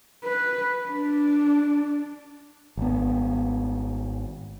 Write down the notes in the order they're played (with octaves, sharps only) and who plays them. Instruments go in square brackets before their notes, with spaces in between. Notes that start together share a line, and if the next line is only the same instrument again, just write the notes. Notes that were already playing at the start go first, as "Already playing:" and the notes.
[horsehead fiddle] B4
D4
[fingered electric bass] G#1 B3